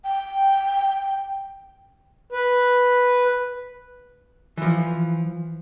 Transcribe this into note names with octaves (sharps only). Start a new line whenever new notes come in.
G5
B4
E3 F3